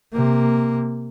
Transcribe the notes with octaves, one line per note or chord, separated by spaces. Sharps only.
C3 A#3